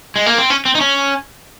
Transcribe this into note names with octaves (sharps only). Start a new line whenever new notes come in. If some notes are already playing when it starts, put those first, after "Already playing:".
G#3
A#3
C4
C#4
C4
D#4
C#4